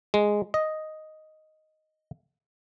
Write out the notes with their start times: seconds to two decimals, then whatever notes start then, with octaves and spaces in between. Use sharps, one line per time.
0.14 G#3
0.54 D#5